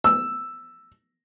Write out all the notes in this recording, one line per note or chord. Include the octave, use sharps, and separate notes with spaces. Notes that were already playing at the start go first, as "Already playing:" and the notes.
E6